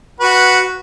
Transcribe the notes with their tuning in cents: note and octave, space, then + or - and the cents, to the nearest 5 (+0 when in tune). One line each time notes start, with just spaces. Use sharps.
F#4 +0 B4 -10